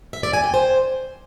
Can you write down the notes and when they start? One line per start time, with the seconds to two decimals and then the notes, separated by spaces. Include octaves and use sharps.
0.13 E5
0.23 D5
0.33 G#5
0.44 G5
0.54 C5